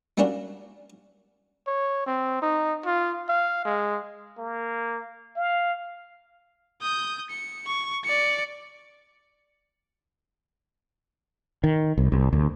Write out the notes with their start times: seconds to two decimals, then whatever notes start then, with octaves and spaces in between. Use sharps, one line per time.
0.18 F#3 G3 A#3 C#4 D4 F#4
1.67 C#5
2.07 C4
2.42 D#4
2.85 F4
3.29 F5
3.65 G#3
4.38 A#3
5.36 F5
6.82 D#6 G6
7.30 C#7
7.67 C#6
8.04 D5 C#7
11.64 D#3
11.98 C2
12.12 C2
12.33 D2